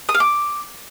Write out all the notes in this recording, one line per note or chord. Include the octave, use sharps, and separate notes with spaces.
D#6
F5
D6